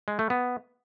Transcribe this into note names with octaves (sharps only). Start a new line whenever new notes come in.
G#3
A3
B3